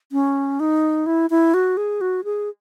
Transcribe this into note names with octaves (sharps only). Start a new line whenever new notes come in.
C#4
D#4
E4
E4
F#4
G#4
F#4
G#4